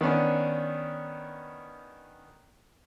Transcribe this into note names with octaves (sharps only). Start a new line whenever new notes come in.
D#3 B3 C#4 D4